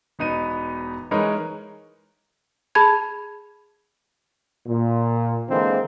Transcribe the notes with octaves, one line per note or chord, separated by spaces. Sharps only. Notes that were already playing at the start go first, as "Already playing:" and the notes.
E1 B3 D#4 D#7
E3 G#3 D#4 A#4 B4 C#5
G#4 A5 B5 G#6
A#2
D3 E3 G#3 A#3 C4